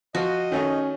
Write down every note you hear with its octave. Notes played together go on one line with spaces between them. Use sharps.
F3 F4 F#4 D#5
D#3 A3 C#4 D#4